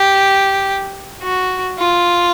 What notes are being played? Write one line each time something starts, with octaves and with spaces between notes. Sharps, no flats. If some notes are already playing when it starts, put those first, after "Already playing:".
Already playing: G4
F#4
F4